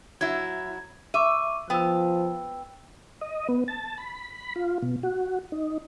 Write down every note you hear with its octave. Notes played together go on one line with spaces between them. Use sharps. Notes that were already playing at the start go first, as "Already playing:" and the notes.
F#3 E4 G#6
E5 C#6 D6 D#7
F3 B3 G5 E6
D#5
B3
A5
B5
F4
B2
F#4
D#4